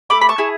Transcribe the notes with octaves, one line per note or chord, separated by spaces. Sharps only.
A3 B5 D6
B5
A5 C#6
E4 G#4